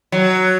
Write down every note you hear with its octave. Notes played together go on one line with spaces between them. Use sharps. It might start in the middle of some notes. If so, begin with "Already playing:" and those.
F#3